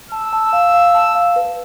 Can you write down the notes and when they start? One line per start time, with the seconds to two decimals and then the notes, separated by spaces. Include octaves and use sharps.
0.11 A5 E6
0.33 A5
0.53 F5
0.74 F5
0.94 A5
1.15 F5
1.36 B4